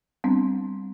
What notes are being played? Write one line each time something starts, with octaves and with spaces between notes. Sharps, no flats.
G3 B3 C4 D4